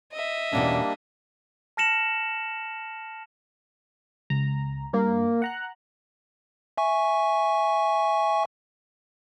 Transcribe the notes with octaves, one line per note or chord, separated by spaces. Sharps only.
D#5 E5
E2 B2 G3 A#3 C#4 D4
A5 F6 A#6 C#7 E7 F#7
C#2 A#5
G2 A#3
F#5 A#5 F#6
E5 G#5 C#6